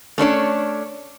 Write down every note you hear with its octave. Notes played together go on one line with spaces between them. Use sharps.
A3 C#4 D4 C#5